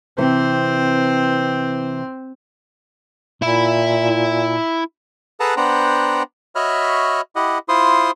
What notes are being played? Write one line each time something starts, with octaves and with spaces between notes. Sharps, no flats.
C3 E3 C4 C5
A#2 E4 E5
G#4 A4 B4 F#5 A5 A#5
B3 D4 C5 F#5 G5 A#5
F#4 C#5 D#5 E5 B5 F6
E4 G4 D#5 F#5
E4 F4 C5 C6 D#6